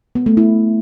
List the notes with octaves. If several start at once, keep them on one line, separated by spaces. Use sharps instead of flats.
B3
A3
E4